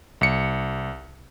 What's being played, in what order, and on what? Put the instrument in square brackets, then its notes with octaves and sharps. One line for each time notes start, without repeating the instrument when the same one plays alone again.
[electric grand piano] C2 C#7